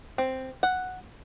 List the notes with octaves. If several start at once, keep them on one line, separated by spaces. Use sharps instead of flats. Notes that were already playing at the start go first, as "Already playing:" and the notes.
C4
F#5